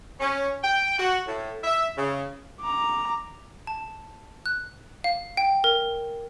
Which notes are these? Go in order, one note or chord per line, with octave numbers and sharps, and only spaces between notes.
C#4
G5
F#4
A2
E5
C#3
A#5 D6
A5
F#6
F5
G5
A#4